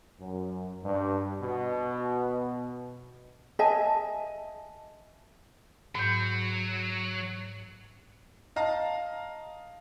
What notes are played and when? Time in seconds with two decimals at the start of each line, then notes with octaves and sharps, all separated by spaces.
0.20 F#2
0.84 G2
1.42 B2
3.59 D#5 E5 G#5 A5
5.95 G#2 F#3 G6
8.56 D#5 F5 A5 A#5